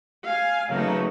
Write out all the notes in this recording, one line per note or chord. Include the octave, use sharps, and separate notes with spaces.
F5 G#5
C#3 F#3 A3 A#3 D#4 B4